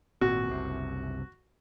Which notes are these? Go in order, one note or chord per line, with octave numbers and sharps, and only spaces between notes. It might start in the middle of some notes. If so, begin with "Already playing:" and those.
G#1 A#2 C4 F#4
F#1 C2 C3